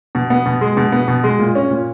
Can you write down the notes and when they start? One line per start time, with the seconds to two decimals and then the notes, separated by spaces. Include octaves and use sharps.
0.15 B2
0.30 B3
0.46 B2
0.61 G#3
0.77 B2
0.92 B3
1.08 B2
1.24 G#3
1.39 A#2
1.55 C#4
1.70 A#2